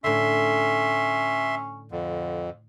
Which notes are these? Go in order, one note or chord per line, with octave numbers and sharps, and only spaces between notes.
A2 D3 C#4 E5 C6
F2 D3